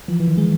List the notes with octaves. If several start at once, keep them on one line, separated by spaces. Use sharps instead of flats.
E3 F3
E3
D#3
G#3